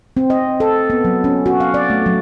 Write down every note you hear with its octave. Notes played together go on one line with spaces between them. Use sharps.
C4
D#5
A4
B3
F#3
C#4
F#4
F5
D5
A3
F#3